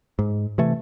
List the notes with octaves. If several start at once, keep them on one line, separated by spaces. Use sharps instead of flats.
G#2
C3 E3 A3